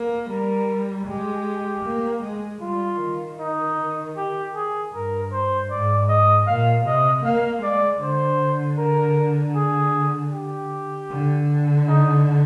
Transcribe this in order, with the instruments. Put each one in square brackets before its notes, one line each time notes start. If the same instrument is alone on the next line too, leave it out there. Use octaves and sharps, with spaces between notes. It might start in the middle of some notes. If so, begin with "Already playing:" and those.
Already playing: [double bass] A#3
[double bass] G3 [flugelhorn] A#4
[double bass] G#3 [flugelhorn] G4
[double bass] A#3
G#3
[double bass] G3 [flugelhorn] F4
[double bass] D#3
[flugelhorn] D#4
G4
G#4
[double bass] G2 [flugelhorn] A#4
[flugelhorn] C5
[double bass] G#2 [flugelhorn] D5
[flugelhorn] D#5
[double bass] A#2 [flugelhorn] F5
[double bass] C3 [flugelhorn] D#5
[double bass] A#3 [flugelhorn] F5
[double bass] G#3 [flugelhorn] D5
[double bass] D3 [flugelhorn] C5
[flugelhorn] A#4
G#4
G4
[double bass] D3
[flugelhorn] D#4